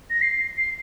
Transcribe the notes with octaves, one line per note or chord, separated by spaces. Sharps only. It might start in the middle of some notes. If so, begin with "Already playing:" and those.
A#6
C7
C7